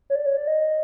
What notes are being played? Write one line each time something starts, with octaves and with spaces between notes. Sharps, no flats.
C#5
D5
C#5
D5
D#5